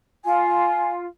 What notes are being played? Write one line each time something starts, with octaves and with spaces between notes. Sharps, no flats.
F4 G#5